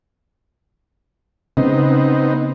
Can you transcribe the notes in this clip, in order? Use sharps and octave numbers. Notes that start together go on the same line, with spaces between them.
C#3 B3 C4 D#4